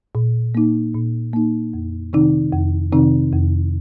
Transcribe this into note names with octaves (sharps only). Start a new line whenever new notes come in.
A#2
A#3 D#4
A#2
A#3 D#4
F2
C3 D#3 C4 D#4
F2
C3 D#3 C4 D#4
F2